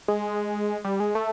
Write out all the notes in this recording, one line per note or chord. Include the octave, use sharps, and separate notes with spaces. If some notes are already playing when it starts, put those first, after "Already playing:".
G#3
G3
G#3
A3